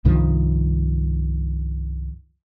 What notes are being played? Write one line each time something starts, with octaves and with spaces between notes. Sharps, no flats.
C2 G2 D#3 F3